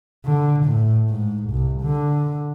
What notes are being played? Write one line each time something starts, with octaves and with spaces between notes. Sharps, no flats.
D3
A2
G#2
C2
D3